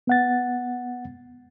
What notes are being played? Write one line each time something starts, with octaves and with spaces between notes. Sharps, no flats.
B3 F#5 A6